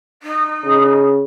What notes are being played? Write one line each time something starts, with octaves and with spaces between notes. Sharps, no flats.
D#4
C#3